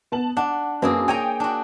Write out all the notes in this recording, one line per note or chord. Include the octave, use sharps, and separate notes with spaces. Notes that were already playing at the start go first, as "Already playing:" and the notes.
B3 A5 F#7
D4 F#5
F#2 A#3 C4 G#4 B4
C#5 G5 G#5 A#5 D#6
D4 F#4